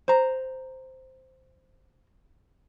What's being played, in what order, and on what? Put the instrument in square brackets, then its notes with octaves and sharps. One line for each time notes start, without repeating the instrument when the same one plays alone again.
[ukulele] C5 A#5